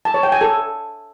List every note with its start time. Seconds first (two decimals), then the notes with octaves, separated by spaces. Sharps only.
0.05 A5
0.14 C#5
0.23 G5
0.32 G#5
0.41 A4